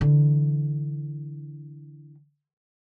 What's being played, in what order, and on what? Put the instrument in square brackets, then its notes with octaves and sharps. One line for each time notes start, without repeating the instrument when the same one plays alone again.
[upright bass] D3 E3